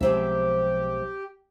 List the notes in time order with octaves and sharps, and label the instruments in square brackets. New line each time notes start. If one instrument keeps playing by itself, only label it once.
[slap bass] B1 [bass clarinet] F3 [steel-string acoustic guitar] G#3 C4 E5 [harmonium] G4